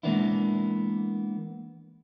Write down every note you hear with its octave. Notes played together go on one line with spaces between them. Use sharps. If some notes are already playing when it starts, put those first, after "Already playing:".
E3 G#3 A#3 B3 D4 E4